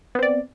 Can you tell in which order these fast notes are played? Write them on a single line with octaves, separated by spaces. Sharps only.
B3 C4 D5